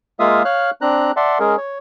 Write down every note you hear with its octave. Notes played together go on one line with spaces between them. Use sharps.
G#3 A#3 F4 E5 F5 D#6
C#5 F5 F6 F#6
C4 D4 A#5 F#6
D5 E5 F#5 A5 C6
G#3 C#4 G#4 A#4
C#5